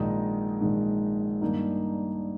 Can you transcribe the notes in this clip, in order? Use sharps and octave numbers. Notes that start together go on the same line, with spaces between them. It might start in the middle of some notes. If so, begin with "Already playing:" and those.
Already playing: A#1 G#2 D#3 D#4 D#5
A#1 G#2 D#3
G2 D#3 A#3 D#4